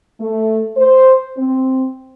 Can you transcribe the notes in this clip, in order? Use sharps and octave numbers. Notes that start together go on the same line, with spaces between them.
A3
C5
C4